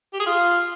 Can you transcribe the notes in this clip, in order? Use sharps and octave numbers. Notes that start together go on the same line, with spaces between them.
G4
G#4
F4